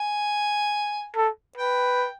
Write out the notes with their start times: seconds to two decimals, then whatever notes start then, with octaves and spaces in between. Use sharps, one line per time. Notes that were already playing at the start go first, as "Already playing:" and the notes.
Already playing: G#5
1.16 A4
1.57 B4 G5